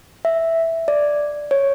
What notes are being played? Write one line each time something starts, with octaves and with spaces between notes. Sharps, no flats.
E5
D5
C#5